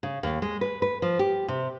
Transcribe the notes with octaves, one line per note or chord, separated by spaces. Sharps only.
C#3
D#2
G#3
B4
B4
F3
G4
C3